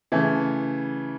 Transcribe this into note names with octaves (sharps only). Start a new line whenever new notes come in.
C#3 E3 A3